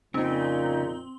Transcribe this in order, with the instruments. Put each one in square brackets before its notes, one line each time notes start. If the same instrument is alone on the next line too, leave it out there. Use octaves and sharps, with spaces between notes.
[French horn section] F2 A#2 [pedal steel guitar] C#3 [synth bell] C4 [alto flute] D#4